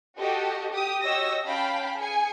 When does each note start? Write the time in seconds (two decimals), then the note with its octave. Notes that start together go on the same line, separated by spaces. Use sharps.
0.19 F#4 G4 A4 D#5
0.72 G4 D#6
1.02 F#4 G4 C#5 D#5 E6 A#6
1.45 C#4 F5 G5 A5 B5
1.97 G#4 G#5 C#7